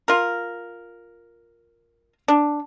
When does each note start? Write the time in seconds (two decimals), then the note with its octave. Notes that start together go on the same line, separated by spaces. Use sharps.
0.08 F4 A#4
2.28 D4